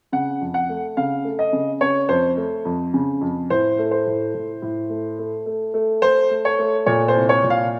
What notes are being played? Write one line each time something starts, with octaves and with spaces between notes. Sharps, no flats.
C#3 F#5
F2
F#5
A3
C#3 F5
A3
D#5
C#3
C#3 C#5
F2 C5
A3
F2
C#3
F2
A2 C5
A3
C5
A2
A2
A2
A3
A3
A3
A3
A3 C5
A3
C#5
A3
A#2 C#5
C5
C2
C#5
A#2
F5